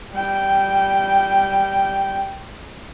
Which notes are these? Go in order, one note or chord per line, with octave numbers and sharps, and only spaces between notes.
G3 G5